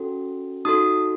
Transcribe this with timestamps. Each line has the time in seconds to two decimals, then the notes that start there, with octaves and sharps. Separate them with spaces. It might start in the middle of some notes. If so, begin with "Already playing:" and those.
Already playing: C#4 F#4 A4
0.65 D#4 F#4 A4 D#6